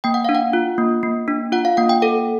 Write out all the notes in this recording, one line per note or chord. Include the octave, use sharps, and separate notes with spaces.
A#3 G5
F#5
D4 F5
F#5
F4
A#3
A#3
D4
F4 F#5
F5
A#3 F#5
G5
A4 F#5